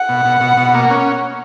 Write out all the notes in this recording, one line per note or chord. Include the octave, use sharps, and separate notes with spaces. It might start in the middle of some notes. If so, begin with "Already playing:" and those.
Already playing: F#5
B2
B2
B2
B2
A#3
C#4